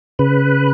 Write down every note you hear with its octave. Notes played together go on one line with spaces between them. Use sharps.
C#3 B4